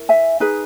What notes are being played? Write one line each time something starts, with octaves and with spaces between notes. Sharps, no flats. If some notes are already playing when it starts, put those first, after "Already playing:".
Already playing: E4 A#4
E5 G#5
D#4 G#4 B4